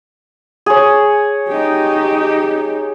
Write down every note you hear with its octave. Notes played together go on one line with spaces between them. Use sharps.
G#4 C#5
D#4 G4